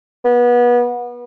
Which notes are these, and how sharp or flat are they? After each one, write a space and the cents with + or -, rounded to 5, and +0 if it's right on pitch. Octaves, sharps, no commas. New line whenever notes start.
B3 -30